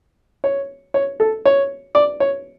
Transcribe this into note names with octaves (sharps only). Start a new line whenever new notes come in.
C#5
C#5
A4
C#5
D5
C#5